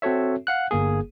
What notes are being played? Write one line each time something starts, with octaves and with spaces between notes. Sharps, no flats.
C4 F#4 A4 C#5 E5
F5 F#5 F#6
G1 A#3 G#4